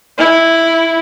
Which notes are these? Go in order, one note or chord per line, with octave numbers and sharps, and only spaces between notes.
E4